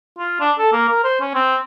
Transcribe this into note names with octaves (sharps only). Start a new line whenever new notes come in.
F4
D4
A4
A#3
A#4
C5
C#4
C4